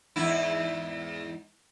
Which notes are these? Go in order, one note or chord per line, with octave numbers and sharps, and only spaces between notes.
E2 G#2 E4